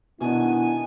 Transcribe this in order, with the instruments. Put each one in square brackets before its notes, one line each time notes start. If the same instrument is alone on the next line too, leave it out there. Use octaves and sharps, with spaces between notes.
[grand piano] B2 D4 [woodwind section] D#3 B3 [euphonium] E4 [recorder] G#5